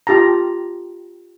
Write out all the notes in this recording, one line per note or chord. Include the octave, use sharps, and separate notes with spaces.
F4 G4 A5 A#5